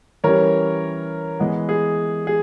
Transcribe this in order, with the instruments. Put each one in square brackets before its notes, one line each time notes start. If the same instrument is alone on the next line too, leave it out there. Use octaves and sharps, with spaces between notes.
[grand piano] E3 G3 C#4 A#4 C#5
E3 G#3 B3
G#4
G#4